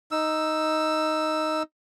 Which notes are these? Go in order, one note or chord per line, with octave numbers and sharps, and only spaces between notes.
D#4 E6